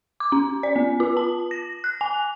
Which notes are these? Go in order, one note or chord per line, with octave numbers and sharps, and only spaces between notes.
D6
C#4
D5
B3
F4
A5
A#6
F#6
G#5